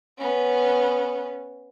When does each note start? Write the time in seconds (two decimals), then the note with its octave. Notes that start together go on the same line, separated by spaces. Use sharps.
0.18 B3 C#4